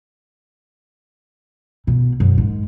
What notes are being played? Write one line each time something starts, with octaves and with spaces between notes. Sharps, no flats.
B2
F#2
G#2